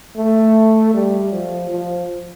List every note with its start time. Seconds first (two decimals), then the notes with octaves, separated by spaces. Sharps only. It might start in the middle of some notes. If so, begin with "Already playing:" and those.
0.17 A3
0.94 G3
1.32 F3
1.71 F3